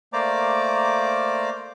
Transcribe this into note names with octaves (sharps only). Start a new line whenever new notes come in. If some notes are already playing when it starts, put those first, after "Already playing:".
A3 A#3 C5 D5 A#5 D6